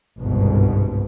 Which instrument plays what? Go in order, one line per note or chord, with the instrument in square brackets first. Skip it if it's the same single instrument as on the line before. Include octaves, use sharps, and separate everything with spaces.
[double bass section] G1 C2 G#2 B2